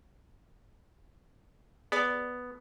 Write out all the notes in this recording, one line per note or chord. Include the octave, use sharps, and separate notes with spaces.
B3 G#4 D5